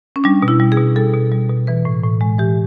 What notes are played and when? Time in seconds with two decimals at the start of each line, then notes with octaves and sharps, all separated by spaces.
0.16 C#4
0.24 G3 D4
0.43 B2
0.48 E4
0.60 G3
0.72 G#4
0.78 B2
0.96 G3 A4
1.13 B2
1.32 G3
1.49 B2
1.67 E3 B4
1.85 A2
2.04 A2
2.21 G#3
2.38 E3 G4